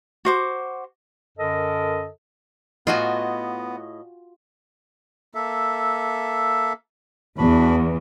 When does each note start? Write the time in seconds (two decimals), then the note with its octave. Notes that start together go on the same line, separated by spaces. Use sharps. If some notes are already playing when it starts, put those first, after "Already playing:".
0.25 F#4 C5 D6
1.38 F#2 D3 A4 A#4 D#5
2.87 A2 B3 F4 F#4 D#5 G#5
5.34 A#3 A4 E5
7.38 E2 D4 F#4 B5